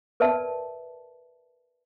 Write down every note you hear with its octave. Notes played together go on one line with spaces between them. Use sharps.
A#4 B4 D5 E5 A5